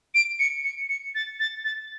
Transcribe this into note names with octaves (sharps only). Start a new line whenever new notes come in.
D7
C#7
C#7
C#7
A6
A6
A6